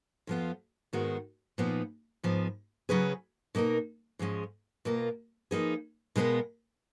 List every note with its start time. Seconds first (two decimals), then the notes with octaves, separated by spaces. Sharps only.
0.27 F2 F3 B3 F4
0.93 G#2 D#3 G#3 B3 F#4
1.58 A#2 F3 B3 D#4
2.23 G#2 F3 B3
2.89 C#3 F#3 C#4 G#4 B4
3.55 B2 A#3 D#4 A#4
4.19 G#2 F3 G#3 C#4
4.85 B2 A#3 F4 A#4
5.51 F3 A#3 D#4 G#4 B4
6.16 B2 G#3 B3 F4 A#4